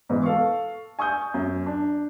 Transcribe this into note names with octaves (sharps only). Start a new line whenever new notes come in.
G#2 B2 E3
A4 F5 C#6
G#5 C#6 D#6 G6
F#2
D4